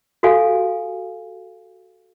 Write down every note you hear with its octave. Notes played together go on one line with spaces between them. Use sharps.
F#4 G4 A4 D5 F5 G#5